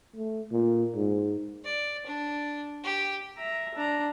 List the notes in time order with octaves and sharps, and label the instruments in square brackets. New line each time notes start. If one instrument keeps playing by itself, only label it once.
[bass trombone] A3
A#2
G#2
[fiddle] D5
D4
G4
[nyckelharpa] E5 A#5
D4 A#5